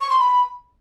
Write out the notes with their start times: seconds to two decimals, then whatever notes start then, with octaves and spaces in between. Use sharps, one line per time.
0.01 C#6
0.10 C6
0.19 B5